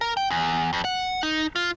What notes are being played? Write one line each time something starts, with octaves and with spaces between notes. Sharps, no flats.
A#4
G5
E2
F2
F#5
D#4
F4